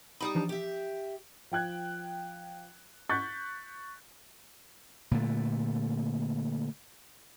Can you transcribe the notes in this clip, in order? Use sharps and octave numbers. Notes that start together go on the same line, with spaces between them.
G3 D#4 B5 D#6
E3 F3 D4
G4 E5
F3 G5 F#6 G#6
C#6 F#6 G6 A6 B6
A#2 D3 A3